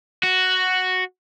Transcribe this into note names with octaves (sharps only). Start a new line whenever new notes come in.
F#4